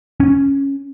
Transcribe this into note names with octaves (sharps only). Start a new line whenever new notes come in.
C#4